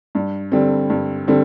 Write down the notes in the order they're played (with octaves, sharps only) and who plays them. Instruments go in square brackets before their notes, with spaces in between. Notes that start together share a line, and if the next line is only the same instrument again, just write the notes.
[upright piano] G2
D3 G3 C4
G2
D3 G3 C4